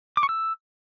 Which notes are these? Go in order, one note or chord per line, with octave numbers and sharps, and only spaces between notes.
D6
C#6
E6